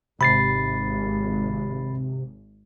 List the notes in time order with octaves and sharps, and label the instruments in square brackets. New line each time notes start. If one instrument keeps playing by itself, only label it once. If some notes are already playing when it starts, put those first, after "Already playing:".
[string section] G#1 [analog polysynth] C3 [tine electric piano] B5 A6 C7